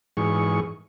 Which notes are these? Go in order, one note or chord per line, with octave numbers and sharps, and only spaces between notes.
G#2 E3 G#4 C#6